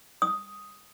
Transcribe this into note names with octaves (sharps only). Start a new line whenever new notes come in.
D#6